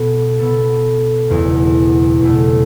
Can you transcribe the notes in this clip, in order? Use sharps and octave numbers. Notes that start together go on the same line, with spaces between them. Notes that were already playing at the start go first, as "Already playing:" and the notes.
Already playing: B2 B3 A4
B2 B3 A4
F#1 E2 B2 A3
F#1 E2 B2 A3